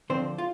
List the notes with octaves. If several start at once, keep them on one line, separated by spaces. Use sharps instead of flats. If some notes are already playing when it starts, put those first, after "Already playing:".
D2 D3 F3 C4 C5
F4